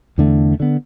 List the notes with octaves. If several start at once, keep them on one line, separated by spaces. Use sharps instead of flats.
E2 D3 A3
D3 B3